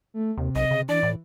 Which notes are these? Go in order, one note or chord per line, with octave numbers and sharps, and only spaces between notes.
A3
D#2 C3
B1 D#5
C#3
E3 D4 D5
A2